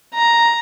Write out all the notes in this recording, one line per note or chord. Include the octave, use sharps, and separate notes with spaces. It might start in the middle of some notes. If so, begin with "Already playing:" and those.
A#5